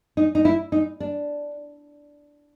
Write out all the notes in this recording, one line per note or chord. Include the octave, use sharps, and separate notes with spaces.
D#4
D#4
E4
D#4
D4